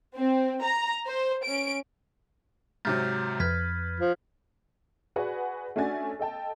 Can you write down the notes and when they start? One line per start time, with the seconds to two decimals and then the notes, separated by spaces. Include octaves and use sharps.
0.16 C4
0.62 A#5
1.08 C5
1.44 C#4 D7
2.85 G#2 C3 F#3 F6 G6 A6
3.40 F2 B4 F6 G#6 B6
4.00 F3
5.16 F#4 G#4 B4 D5 F#5 G#5
5.76 A3 C#4 D4 F#4 G#5 A6
6.19 A4 D#5 G5 A5